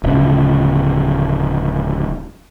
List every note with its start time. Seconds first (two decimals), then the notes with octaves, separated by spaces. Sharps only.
0.03 D1 C#3